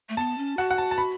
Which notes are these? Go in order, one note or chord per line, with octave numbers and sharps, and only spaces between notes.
A3
B3 A5
C#4
F#4 F#5
F#5
A5
A5
B5